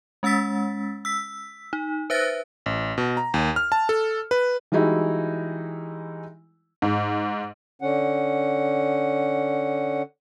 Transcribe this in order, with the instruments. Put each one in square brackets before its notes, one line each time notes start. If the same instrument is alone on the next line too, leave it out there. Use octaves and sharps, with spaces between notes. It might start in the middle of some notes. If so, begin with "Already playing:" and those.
[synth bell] G#3 C#4 E6 A6 B6
E6 B6
D#4
B4 C5 E5 F#6 A6 A#6
[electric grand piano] A1
B2
A#5
D#2
F6
A5
A4
B4
[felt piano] E3 G3 G#3 D#4 E4 F#4
[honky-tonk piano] G#2
[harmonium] D3 C#4 F#5